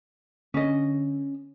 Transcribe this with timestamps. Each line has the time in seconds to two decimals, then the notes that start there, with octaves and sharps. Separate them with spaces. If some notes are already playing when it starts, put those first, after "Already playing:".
0.54 D3 C#4 D#5